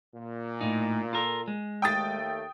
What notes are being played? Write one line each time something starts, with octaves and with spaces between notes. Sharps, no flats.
A#2
A2 D#4
F4 A4 A#4
G#3
D#2 A3 G5 D#6 A6